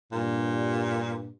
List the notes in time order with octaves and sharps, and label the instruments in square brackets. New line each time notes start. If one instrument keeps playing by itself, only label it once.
[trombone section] G2 [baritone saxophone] A#2